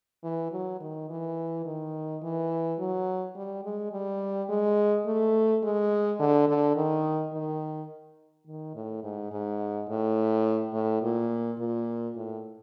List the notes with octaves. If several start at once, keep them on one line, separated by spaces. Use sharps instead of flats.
E3
F#3
D#3
E3
D#3
E3
F#3
G3
G#3
G3
G#3
A3
G#3
D3
D3
D#3
D#3
D#3
A2
G#2
G#2
A2
A2
A#2
A#2
A2